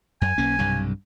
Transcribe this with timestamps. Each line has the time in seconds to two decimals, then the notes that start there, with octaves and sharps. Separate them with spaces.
0.21 F#2 G#5
0.38 B1 A#3 C#4
0.58 B1 G2 C3